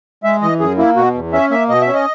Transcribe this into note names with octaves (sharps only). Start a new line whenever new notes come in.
G#3 E5
E3 D#5
F#2 G#4
A#3 E4
B2 F#4
E2
C#4 E5
A#3 E5
B2 D#5
E5
C#4
D#5